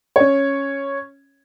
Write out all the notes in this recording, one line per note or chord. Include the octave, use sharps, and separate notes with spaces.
C#4 C#5